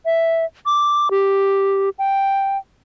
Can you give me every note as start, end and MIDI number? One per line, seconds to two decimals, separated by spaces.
0.06 0.45 76
0.66 1.09 86
1.11 1.89 67
1.99 2.58 79